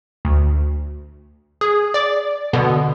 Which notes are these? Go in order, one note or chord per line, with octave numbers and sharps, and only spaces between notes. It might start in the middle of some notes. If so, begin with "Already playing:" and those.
D2
G#4
D5 D6
B2 D3 B3